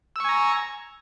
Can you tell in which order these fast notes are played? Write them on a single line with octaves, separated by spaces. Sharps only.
E6 C#6 G#5 A#5